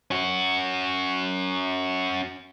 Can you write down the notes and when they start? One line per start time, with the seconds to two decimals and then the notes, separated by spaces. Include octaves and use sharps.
0.11 C#4 F#4